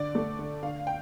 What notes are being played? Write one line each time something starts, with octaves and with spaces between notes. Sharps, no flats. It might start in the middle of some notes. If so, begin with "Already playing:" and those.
Already playing: D3 D5
A3
D3
D3 F5
G5